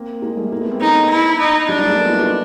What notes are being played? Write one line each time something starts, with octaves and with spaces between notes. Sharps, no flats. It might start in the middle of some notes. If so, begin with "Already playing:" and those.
Already playing: A#3 C4
G#3 A#3
G3 A3
G#3 A#3
A3 B3
A#3 C4
B3 C#4 D#4
E4
D#4
F#3 G#3 D4
G3 A3
G#3 A#3
A3 B3
D#4 F4
E4 F#4
E4 F#4